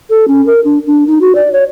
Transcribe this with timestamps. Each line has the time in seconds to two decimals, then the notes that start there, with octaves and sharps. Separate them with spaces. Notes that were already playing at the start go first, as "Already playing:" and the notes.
0.10 A4
0.28 C#4
0.46 A#4
0.64 D4
0.87 D4
1.07 D#4
1.21 F#4
1.35 D5
1.53 C#5